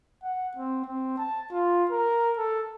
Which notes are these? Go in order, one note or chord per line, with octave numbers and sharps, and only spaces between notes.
F#5
C4
C4
A5
F4
A#4
A4